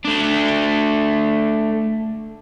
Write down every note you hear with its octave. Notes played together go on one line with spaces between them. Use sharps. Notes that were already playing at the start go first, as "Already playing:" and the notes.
A3 D4